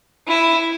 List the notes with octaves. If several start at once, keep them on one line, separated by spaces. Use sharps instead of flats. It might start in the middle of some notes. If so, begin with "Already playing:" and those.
E4